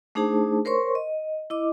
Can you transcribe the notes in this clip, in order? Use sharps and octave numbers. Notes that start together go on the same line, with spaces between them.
A3 D4 D#4 G#4 C5 A5
A#4 C5 C#5 C6 C#6
D#5
E4 D#5 D6